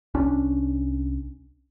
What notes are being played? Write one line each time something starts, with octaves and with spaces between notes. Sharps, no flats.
C2 C#4 D4